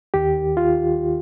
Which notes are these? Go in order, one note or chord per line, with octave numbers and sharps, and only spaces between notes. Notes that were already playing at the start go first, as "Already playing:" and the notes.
D#2 D#3 G4
F4